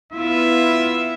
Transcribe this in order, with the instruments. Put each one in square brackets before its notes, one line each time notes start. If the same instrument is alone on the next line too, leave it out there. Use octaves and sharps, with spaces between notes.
[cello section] B3 E4 F4 [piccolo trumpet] E5